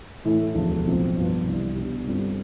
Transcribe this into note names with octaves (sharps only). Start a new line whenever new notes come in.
A2 E3 A3 E4
E1 D2 D3 F3 A3
B1 A2 F3 C4 F4
G2 F3 B3 F4 B4
C2 C3 E3 G3
B2 B3 D4 G4
G2 D3 G3 C4 F4